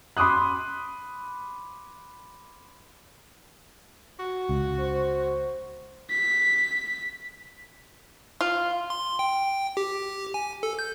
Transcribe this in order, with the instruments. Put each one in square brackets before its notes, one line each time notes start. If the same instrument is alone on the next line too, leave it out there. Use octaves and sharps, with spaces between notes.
[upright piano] B5 C6 D6 D#6 F#6
[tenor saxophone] F#4
[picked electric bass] C#2
[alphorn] C5
[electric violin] B6
[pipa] F4
[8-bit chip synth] C6
G5
G4
G#5
A4
G6